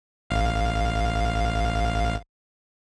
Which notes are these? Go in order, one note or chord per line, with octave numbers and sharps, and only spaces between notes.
A1 F5